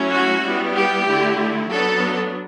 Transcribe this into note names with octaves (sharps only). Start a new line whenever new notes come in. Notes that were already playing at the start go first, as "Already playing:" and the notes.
Already playing: F#3 A3 C#4 E4
F#4
G3 B3 E4
G4
D3 A3 E4
F#3 B3 D4 A4